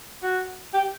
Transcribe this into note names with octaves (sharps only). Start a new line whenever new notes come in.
F#4
G4